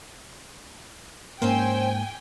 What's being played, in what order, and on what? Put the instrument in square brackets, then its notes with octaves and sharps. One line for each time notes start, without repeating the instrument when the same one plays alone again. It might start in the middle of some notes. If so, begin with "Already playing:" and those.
[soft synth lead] G#2 [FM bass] A#3 [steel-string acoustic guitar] C4 C#4 C5 [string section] G5 G#5